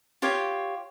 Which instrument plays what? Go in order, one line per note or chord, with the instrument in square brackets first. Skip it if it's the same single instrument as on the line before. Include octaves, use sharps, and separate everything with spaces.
[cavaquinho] F4 G4 C#5 F5